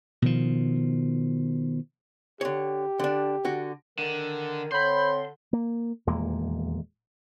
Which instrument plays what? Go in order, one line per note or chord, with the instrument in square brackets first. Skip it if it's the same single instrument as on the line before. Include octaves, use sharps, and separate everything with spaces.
[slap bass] B2 D#3 F3
[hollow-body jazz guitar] D3 C#5 [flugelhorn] G4
[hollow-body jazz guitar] D3 D4
D3 F#4
[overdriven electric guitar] D3 [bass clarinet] D#3
[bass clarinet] D3 [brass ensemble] C4 C#5 [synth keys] B5 G6 [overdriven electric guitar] C6
[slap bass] A#3
D#1 E2 G#3 A#3